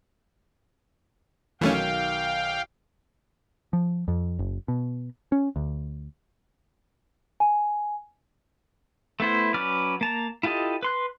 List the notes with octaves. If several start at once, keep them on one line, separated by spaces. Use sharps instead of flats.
B1 D#3 E3 A3 C#4 F5 G5
F3
F2
F#1
B2
C#4
D2
G#5
A3 B3 E4 C5
F#3 C#4 B4 D5 F6
A#3 A5 A#5
E4 F4 G4 A4 D#5
B4 C6 F#6